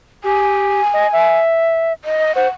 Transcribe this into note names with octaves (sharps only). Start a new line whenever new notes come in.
G4 G#5
D#5
E5
D#5
C5 F#5